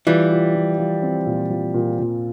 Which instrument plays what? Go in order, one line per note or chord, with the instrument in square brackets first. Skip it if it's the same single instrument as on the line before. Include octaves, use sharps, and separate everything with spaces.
[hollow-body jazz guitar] E3 G3 [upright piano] F4
[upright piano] F4
F3
F3
C4
A#2
F3
A#2
A#2